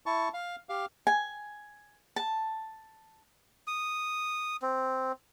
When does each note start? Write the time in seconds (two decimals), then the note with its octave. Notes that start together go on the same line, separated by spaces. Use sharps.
0.06 E4 A5 C#6
0.34 F5
0.69 G4 F5
1.07 G#5
2.16 A5
3.67 D#6
4.62 C4